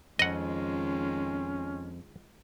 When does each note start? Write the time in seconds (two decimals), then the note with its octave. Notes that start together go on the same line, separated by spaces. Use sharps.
0.19 F2 D#3 G#3 C#4 F4 D#5 F#5